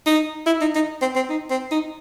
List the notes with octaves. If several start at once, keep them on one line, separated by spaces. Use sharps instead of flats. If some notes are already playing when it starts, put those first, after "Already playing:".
D#4
E4
D#4
D#4
C4
C4
D#4
C4
D#4